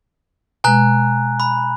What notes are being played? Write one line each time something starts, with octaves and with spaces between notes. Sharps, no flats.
B2 G#3 G#5 A#5 F#6
B5